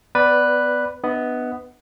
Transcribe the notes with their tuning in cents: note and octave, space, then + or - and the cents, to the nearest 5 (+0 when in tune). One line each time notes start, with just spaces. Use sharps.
B3 +20 B4 +0 D5 +0
B3 +5 D4 +25 D#5 +45